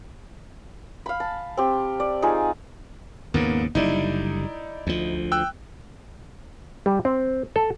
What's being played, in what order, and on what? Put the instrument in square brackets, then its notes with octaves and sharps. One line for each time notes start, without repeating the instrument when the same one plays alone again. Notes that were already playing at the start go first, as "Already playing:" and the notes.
[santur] F5 B5
A5
C4 G4
D5
D#4 F4 G#4 G#5
[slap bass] D#2 G#2 C#3 [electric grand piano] A#3 B3
[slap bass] F#1 D3 G3 [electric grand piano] D#4 E4 D5
[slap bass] D2 F3
[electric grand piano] G5 E6 F#6
[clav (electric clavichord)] G3
C4
A4